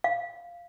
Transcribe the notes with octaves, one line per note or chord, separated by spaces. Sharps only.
F5